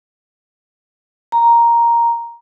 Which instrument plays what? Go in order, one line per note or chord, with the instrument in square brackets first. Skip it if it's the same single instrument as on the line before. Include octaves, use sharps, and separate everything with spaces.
[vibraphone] A#5